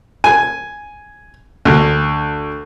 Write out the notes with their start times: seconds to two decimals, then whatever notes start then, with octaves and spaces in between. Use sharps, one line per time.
0.24 G#5
1.65 D2